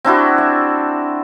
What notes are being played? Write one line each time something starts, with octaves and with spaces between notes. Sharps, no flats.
C4 D4 E4 F#4
E5